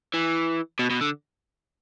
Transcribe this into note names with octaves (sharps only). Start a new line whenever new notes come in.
E3
B2
B2
D3